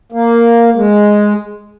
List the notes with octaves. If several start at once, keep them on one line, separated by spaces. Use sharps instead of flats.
A#3
G#3